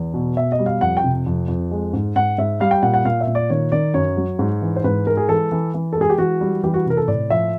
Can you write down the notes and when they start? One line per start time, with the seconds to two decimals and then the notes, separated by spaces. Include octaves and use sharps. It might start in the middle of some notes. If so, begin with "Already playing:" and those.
Already playing: E2
0.14 B2
0.37 B2 E5
0.52 D#5
0.59 G3
0.66 F5
0.81 F2 F#5
0.97 G5
1.04 C3
1.26 F2
1.48 F2
1.71 G#3
1.93 G#2
2.16 G#2 F#5
2.38 G#2 E5
2.60 G3 F5
2.71 G5
2.83 A#2 F#5
2.94 F#5
3.05 A#2 F5
3.21 E5
3.27 A#2
3.35 D5
3.50 D#3 C#5
3.72 D#3 D5
3.94 F#2 C#5
4.17 F#3
4.39 G#2
4.62 E3
4.76 C5
4.84 G#2 B4
5.06 G#3 A#4
5.17 G#4
5.28 E3 A4
5.51 E3
5.74 E3
5.93 G#3 A4
6.01 G#4
6.10 G4
6.18 E3 F#4
6.41 G3
6.63 E3 G4
6.74 F#4
6.86 C3 A#4
6.97 A4
7.07 A2 D5
7.30 F3 E5